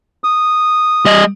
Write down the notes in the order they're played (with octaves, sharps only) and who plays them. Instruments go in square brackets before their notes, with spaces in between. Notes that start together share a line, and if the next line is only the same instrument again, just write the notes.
[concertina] D#6
[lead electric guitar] G3 D#5